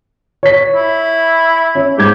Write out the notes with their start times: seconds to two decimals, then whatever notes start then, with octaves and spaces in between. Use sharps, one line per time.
0.43 C#5 B6
0.75 E4
1.75 C#4
1.98 G#2 G4 G#6